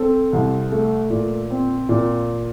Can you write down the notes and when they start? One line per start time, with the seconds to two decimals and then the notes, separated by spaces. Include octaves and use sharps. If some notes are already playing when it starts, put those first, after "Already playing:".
Already playing: C4 A4
0.33 C2
0.72 A3
1.10 A#2
1.50 C4
1.89 A#2